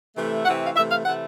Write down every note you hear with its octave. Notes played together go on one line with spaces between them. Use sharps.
C3 E3 A3
C3 E3 A3 F#5
F5
C3 E3 A3 E5
F5
C3 E3 A3 F#5